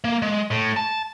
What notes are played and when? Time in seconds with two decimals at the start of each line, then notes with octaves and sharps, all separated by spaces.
0.04 A#3
0.22 G#3
0.51 A2
0.76 A5